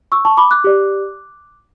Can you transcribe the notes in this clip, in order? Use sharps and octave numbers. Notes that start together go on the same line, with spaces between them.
C#6 E6
A5 C#6
B5 D6
D6 F#6
G4 D5